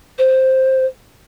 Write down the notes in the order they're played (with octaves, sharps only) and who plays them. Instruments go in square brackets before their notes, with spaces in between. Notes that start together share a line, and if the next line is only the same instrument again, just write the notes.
[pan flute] C5